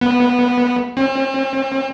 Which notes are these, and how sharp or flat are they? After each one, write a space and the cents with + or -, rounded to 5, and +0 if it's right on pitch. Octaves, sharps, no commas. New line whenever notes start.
B3 -10
C4 +40